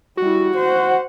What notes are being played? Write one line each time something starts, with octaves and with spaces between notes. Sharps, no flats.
G3 E4 F#4
C5 F#5